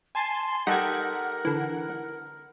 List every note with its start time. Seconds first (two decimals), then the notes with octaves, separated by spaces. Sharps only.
0.15 G#5 A5 C6
0.67 G3 D#4 G4 A4 A#4 F#5 G#6
1.45 D3 E3